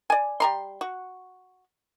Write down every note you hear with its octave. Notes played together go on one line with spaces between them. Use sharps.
D5 G#5
G3 A#5 C6
F#4